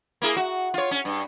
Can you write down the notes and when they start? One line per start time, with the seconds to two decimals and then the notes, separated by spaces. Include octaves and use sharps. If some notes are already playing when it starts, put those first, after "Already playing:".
0.22 A#3 E4 G#4
0.37 F#4
0.74 F4 C#5
0.91 C#4
1.05 G2